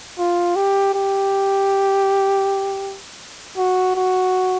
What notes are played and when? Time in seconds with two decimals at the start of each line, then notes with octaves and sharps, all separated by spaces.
0.19 F4
0.56 G4
0.94 G4
3.57 F#4
3.95 F#4